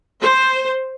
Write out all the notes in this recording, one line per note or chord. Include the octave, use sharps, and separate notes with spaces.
C5